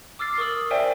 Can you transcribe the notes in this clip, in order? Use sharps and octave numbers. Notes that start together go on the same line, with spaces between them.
D6 E6 F6 A6 C7
A#4 C#6 D#6 E6 F#7
A#4 C5 D5 E5 G5 G#5